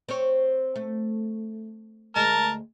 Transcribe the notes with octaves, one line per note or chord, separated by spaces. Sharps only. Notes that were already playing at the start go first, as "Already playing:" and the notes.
C4 C#5
A3
D2 G#3 A#4 A5